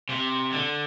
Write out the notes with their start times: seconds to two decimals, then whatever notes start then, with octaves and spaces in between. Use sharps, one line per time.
0.09 C3
0.52 D3